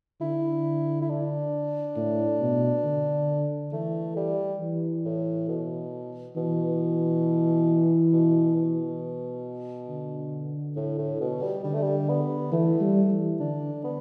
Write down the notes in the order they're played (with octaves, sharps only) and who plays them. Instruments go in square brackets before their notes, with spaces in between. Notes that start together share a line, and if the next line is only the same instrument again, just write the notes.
[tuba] D3 [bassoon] E4
[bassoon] E4
D4
[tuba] A2
B2
D3
[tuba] E3 [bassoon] A3
[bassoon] G3
[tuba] E3
[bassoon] A2
B2
[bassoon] B2 [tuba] E3
[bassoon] B2
B2
[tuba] D3
[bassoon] A2
A2
B2
G3
[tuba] D3 [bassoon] G3
[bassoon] A3
G3
B3
[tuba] E3 [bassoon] A3
[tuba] G3
E3
[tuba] D3 [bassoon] D4
[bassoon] B3